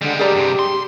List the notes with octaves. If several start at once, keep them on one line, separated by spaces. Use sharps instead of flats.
D3 G3 G#3
G4 G#4 D5 A#5
G2 C3
C6